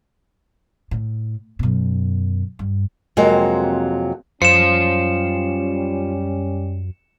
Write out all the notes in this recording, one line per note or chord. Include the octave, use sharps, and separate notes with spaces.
A2
F#2 B2
G2
F2 C3 F#3 G#3 A#3
F#2 G3 C#4 F4 C5 C#7 E7